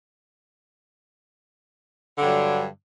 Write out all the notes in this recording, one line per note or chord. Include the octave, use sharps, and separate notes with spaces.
G2 D3 F#3